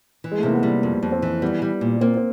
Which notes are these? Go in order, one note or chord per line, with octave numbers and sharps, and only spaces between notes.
E3
G#3
A3
C3 A#3
B3
G3
F2
F2
C4
E3
G3 B3
G3
A#2
A#3 C4
C4